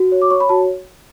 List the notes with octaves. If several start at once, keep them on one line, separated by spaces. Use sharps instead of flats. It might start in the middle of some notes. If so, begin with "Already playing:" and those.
Already playing: F#4
C#5
D6
C#5 C#6
B5
F#4 A5